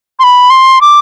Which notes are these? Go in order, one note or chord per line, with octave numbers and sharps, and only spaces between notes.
C6
B5
C6
D6